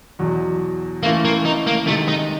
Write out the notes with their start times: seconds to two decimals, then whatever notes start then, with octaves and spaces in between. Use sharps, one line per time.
0.19 E2 B2 F#3
1.03 E3 A3 A#3 C#4 F4
1.24 A#3
1.45 D#4
1.67 A#3
1.87 C3 D#3 G#3 A3
2.08 D#4